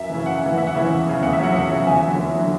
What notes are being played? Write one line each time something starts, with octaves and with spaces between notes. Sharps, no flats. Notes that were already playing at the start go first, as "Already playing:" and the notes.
Already playing: F#2 E5
C#3 E3
F#2 F#5
F#5
C#3 E3
E2 E5
F#5
C#3 E3 E5
E2
C#3 E3
E2 F#5
E5
C#3 F#3 F#5
E2 F#5
C#3 F#3
E2 E5 G#5
D3 F#3
E2
D3 F#3